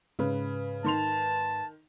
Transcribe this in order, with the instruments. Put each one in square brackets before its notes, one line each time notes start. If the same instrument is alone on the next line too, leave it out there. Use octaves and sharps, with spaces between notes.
[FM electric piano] G#2 B4 [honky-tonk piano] C#3
[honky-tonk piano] D#3 C6 F7 [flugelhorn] A5